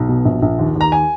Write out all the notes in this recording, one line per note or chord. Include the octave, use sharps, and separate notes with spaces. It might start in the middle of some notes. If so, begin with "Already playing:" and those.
Already playing: B1
B2
A#1
A#1
D#2
D#2
A#5
G#5